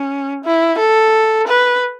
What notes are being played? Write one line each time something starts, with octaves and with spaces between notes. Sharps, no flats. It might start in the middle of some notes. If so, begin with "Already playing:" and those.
Already playing: C#4
E4
A4
B4